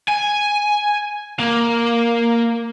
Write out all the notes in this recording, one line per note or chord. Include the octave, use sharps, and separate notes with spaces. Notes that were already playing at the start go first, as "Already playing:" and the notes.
G#5
A#3